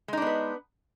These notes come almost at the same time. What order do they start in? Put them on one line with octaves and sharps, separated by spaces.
G#3 D#4 D4 B3 B4